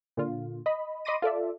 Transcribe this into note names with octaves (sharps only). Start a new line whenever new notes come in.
A#2 D3 F4
D#5 B5
D#5 B5 C6 D6 A#6 D#7
F4 A4 D5 E5